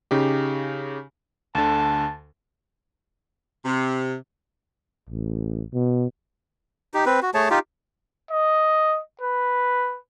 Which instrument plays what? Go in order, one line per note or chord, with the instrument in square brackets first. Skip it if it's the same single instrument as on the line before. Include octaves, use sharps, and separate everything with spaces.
[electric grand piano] C#3 D#4 G4
[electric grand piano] D2 D3 [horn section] A5
[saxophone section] C3
[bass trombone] A1
B2
[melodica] D#4 G4
C4 B4
F#4
A3 G#4 C#5 A5
D#4 F4 G4
[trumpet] D#5
B4